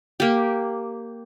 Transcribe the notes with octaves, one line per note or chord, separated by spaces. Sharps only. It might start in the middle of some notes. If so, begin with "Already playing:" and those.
A#3 G4